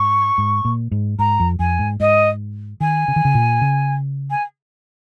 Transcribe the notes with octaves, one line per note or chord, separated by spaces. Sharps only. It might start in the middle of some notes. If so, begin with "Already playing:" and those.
Already playing: G#2 C#6
G#2
A#2
G#2
G#2 A#5
F2
F2 G#5
G#2
G#2 D#5
D#3 G#5
C#3
D#3
C#3
A#2
C#3
G#5